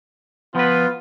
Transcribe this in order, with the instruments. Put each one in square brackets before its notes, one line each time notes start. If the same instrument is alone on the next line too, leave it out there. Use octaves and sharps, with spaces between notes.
[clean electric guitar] F3 B4 [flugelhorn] B3 [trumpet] F4